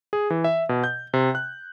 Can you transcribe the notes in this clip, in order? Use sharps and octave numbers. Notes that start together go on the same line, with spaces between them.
G#4
E3
E5
B2
G6
C3
F#6